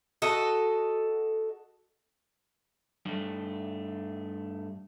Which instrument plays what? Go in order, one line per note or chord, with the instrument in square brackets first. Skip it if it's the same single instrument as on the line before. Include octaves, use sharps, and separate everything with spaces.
[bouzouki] F#4 A4 D#5
[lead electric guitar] G2 A3